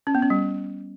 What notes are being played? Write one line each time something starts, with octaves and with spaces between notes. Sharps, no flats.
C#4
B3
C#4
G3